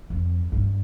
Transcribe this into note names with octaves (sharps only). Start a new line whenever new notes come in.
F2
G2